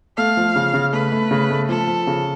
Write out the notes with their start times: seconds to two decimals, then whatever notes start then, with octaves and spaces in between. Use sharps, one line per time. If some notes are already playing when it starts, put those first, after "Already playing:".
0.17 A3 F5
0.37 F3
0.56 C#3
0.74 C#3
0.93 A3 B4
1.12 A3
1.31 C#3
1.50 A3
1.69 F3 A4
1.87 F3
2.07 C#3